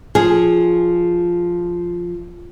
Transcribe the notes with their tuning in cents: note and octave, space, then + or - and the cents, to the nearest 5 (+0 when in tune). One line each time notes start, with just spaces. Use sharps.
F3 +0 G#4 +0